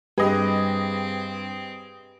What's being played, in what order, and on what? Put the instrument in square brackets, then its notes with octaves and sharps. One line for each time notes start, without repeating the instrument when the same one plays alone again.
[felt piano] G2 [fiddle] C4 [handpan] G4 B4 [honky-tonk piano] G#4 D#5